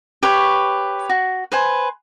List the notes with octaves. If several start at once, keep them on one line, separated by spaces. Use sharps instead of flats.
G4 B4 C#5 C#6
F#4
B4 C5 G#5